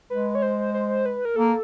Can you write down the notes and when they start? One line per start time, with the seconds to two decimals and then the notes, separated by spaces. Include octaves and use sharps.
0.10 G#3 B4
0.35 C#5
0.42 C5
0.74 C5
1.06 B4
1.25 A#4
1.36 A#3 A4